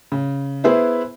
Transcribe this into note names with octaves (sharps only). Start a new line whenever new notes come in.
C#3
B3 E4 G#4 B4 C5 E5